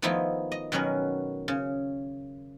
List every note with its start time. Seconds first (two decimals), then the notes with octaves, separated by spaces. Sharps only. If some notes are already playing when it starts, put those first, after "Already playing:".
0.02 D#3 F3 A3 B3 D#4 E4
0.52 D#5
0.72 B2 D#3 F#3 C#4 A#4 B4
1.48 C#3